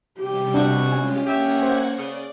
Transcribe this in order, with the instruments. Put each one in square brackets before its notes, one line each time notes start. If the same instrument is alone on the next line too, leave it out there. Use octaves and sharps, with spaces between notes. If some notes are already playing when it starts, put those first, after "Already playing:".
[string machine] C3 G3 [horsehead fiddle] G4
[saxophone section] B2 F#4 [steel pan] D4
[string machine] G#3 F4 G4 [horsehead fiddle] C#4 [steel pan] G#5
[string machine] A#3 F#5 G#6 [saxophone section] G4 E5
[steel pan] C5
[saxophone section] C#3 [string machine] D5